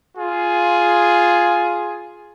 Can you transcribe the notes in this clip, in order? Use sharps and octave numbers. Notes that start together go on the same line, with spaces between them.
F4 G#4